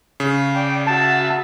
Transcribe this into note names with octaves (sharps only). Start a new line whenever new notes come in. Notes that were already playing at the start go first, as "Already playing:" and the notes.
C#3
D5 G5
F#4 E5 A5